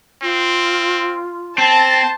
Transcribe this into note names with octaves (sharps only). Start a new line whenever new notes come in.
C4 F4
C4 C5 A5